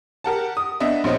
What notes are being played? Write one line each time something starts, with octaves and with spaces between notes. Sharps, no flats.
G4 A#4 F#5 A5
D#6
B3 D4 D#5 E5
A#1 B3 C#4 D#4 C5 D#5